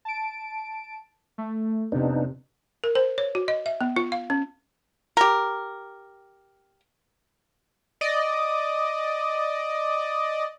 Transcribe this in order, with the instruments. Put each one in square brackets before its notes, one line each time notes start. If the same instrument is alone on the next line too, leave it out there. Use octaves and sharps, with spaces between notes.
[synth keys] A5 D7
A3
[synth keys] F2 C3 [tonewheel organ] B3 D4 D#4
[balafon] A#4
C5
C#5
F#4
D#5
E5
B3
F4
F5
C#4
[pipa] G4 A#4
[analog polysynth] D5 D#5